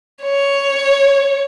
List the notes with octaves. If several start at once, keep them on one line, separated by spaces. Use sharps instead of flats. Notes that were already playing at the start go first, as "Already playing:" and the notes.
C#5